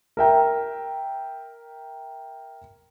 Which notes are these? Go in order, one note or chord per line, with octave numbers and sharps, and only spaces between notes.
A#4 E5 G5 A#5